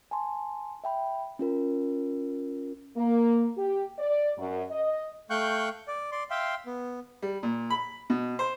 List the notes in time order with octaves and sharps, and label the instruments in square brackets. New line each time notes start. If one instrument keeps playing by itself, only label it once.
[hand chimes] G#5 A5 C6
E5 G5 B5
C#4 F4 A#4
[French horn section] A#3
G4
D5
F#2
D#5
[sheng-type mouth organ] A3 F5 G5 C#6 F#6 G6
D5
D5 C6
E5 F5 G5 C6
B3
[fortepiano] G3
A#2
B5
B2
C5